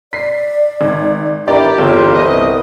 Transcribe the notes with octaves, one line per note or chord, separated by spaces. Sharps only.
D5 B6 C7
G#1
G1 D4 E4 G4 A#4 D5 A#5
G1 E2 C4 F4 C#5
C2 B3 D#5